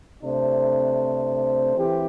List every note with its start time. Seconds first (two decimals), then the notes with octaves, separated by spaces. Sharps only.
0.23 C3 A3 D4 C5
1.76 E3 C4 G4